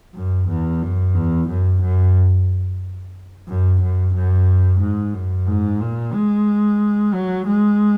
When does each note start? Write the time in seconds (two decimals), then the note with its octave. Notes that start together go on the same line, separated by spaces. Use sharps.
0.15 F#2
0.48 E2
0.81 F#2
1.14 E2
1.48 F#2
1.81 F#2
3.48 F#2
3.81 F#2
4.14 F#2
4.80 G#2
5.14 F#2
5.47 G#2
5.80 A#2
6.13 G#3
7.14 F#3
7.46 G#3